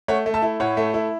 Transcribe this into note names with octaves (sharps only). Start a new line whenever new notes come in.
A3 C#5 F#5
A3
E5 A5
E4
A2 C#5 F#5
A3
E4